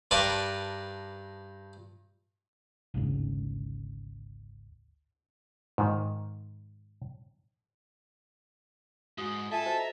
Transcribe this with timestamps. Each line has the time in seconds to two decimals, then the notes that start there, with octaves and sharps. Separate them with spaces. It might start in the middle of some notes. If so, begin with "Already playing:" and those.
0.11 G2 A#4 B4 A5 D6
2.94 G#1 D2 G#2 C#3
5.78 G#2 D#3
9.18 G#2 F#4 D#6
9.52 F4 A4 E5 G#5 A5
9.66 F#4 C5 D#5
9.78 A#5